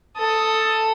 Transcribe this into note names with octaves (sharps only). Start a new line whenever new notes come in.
A4 D#6